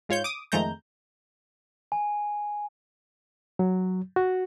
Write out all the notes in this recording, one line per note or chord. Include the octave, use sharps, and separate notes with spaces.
G#2 F4 C#5 G6
D6 D#6
F2 D#3 G#3 A3 A#5 G6
G#5
F#3
F#4